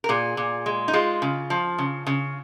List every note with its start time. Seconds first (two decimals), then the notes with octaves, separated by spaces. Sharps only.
0.04 A#4
0.09 A#2 G#4
0.37 A#2
0.66 G#3
0.88 D#4
0.93 G#3 F4
1.22 C#3
1.50 F3
1.78 C#3
2.07 C#3